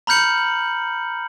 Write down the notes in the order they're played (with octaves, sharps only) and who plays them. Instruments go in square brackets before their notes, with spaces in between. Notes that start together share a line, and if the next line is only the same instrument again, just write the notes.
[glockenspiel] A#5 B5 F6 G6 C#7 F#7